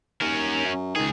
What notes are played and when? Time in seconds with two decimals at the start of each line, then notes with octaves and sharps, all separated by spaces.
0.21 D#2 C#4 A#4
0.65 F#2
0.96 C#2 D#3 G#4